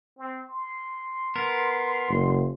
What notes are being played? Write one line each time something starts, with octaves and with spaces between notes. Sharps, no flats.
C4
C6
B3 A#4
F#1